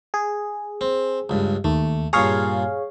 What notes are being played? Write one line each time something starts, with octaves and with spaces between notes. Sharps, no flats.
G#4
C4
C#2 G2
D#2 A3
G2 A#2 G#4 C#5 F5 A#5